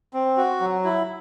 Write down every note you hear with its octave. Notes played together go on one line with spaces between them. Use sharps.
C4
F#4
F#3
E4